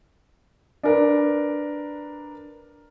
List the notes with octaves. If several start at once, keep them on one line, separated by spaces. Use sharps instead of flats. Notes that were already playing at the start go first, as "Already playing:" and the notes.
D4 A#4 B4